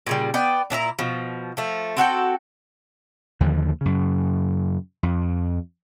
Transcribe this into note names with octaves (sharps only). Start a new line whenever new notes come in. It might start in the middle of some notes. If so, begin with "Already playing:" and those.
A#2 C#3 G3
B3 D5 G5
A#2 D4 E4 A#5
B2 F3
F3 A3
C4 F#4 A4 G5
D#2 D3 F3
F#2 C#3
F2